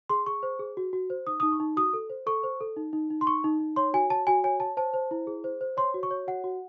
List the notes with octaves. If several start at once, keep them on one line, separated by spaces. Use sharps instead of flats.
G#4 C6
G#4 C#6
C5
G#4
F#4
F#4
C5
D#4 D#6
D#4 D#6
C#6
D#4
F#4 D#6
A4
C5
A4 C#6
C5
A4
D#4
D#4
D#4
C6
D#4 C#6
D#4
D#4
C#5 C6
F#4 G#5
C#5 A5
F#4 G#5
C#5 G#5
C#5 A5
C5 A5
C5
E4
G#4
C5
C5
C#5 C6
F#4
C#6
C#5
F#4 F#5
F#4